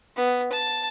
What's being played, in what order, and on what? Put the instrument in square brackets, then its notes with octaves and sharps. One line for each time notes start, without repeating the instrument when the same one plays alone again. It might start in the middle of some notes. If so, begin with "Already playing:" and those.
[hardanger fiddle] B3
A5